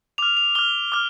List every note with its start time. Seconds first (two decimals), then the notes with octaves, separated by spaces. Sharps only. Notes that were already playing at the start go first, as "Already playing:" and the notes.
0.18 D6 F6 F7
0.37 F7
0.55 D6 F6 G7
0.92 D6 F6